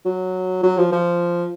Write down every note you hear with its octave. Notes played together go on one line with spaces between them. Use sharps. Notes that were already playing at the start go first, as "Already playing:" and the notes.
F#3
F#3
F3
F3